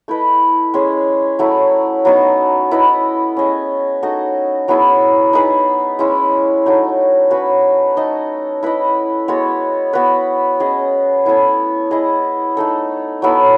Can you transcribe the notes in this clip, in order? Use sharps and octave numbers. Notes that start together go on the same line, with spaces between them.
A3 E4 B4 D#5
G#3 C#4 G#4
F#3 A3 E4
F#3 B3 D#4 F#4
E4 B4 D#5
C#4 G#4 D#5
D#4 F#4 A4 D#5
F#3 B3 E4 G#4
D#4 G#4 B4
G#3 C#4 E4
F#3 A3 D#4
C#4 F#4 B4
A3 D#4 A4 D#5
E4 B4 D#5
G#3 B3 F#4 C#5
B3 F#4 B4
C#4 G#4 D#5
B3 E4 A4 C#5
E4 G#4 D#5
A3 D#4 A4
F#3 B3 E4 A4